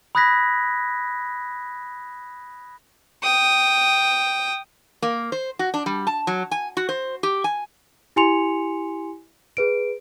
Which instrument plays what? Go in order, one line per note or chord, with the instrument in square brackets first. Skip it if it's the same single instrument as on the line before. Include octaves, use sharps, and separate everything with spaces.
[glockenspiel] B5 D#6 F#6 G#6 A#6 B6
[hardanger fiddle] G5 D#6
[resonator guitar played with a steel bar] A#3
C5
F#4
D4
G3
A5
F#3
G#5
F#4
C5
G4
G#5
[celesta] E4 G4 G#5 C6 C#7 F7
G#4 B4 D7